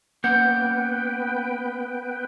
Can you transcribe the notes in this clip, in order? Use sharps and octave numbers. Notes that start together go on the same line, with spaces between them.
A#3 B3 C#4 B4 F#5 G5 G6